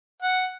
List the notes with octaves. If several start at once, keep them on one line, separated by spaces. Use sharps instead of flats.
F#5